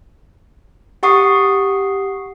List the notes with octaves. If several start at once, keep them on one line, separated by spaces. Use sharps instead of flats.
G4 F#5 C#6 D#6 C7